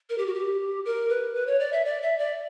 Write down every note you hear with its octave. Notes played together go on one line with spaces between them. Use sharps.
A#4
G4
F#4
G4
A#4
B4
B4
C#5
D5
E5
D5
E5
D5